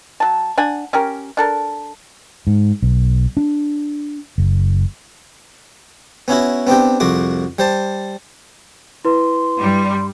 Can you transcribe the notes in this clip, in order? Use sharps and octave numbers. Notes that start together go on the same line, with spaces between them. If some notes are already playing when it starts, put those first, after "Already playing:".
F#3 A5
D4 F#5 G#5
C#4 G4 A#4
D4 A4 A#4
G#2
B1
D4
F#1
B3 C#4 E4 F#4
B3 C4 D4 G4
C2 F2 F#4 D6
G3 C5 A5
E4 B4 C6
G2 G3